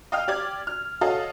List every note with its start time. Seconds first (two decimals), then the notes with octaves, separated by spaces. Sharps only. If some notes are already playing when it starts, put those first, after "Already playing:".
0.12 D#5 F5 G5 D#6 F6
0.28 G4 D5 D6 G#6
0.67 F6
1.01 F#4 A4 C#5 D#5 F5